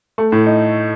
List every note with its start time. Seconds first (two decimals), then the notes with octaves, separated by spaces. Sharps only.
0.18 A3
0.32 A2
0.46 D#4